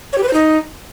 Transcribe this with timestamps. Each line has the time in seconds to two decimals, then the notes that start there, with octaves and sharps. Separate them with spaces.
0.13 C#5
0.18 G4
0.23 B4
0.28 C5
0.33 D#4